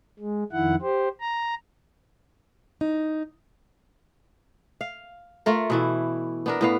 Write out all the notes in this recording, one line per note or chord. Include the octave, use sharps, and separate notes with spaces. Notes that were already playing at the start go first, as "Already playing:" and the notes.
G#3
F2 D#3 E4 F#5
G4 C5
A#5
D#4
F5
A3 F4 A#4
B2 E3 E4
B3 D4 A#4
A2 B3 F5